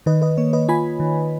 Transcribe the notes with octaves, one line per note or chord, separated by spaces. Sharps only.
D#3 B4 D#5
B4 D#5
A#3 C#5
B4 D#5
F4 G#5 B5
D#3